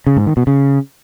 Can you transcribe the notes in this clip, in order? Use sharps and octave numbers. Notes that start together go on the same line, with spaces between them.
C#3
G#2
D#3
B2
C#3